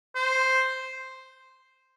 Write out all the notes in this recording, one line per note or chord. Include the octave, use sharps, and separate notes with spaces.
C5